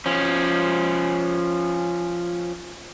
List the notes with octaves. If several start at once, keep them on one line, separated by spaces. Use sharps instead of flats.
F3 C#4